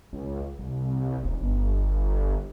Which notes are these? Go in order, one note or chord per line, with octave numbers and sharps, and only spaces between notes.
C#2
C2
D#1
G1